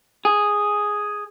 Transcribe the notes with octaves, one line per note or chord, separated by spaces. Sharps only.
G#4